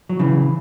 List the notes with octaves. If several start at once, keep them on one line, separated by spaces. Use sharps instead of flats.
F#3
C#3 E3